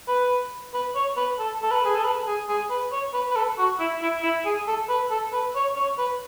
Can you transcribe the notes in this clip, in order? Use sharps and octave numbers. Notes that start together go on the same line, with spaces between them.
B4
B4
C#5
B4
A4
A4
B4
G#4
A4
B4
G#4
G#4
B4
C#5
B4
B4
A4
F#4
E4
E4
E4
G#4
A4
B4
A4
B4
C#5
C#5
B4